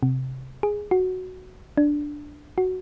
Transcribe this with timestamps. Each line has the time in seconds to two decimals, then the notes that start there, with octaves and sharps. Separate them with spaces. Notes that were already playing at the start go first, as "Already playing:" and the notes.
0.03 C3
0.63 G#4
0.91 F#4
1.77 D4
2.58 F#4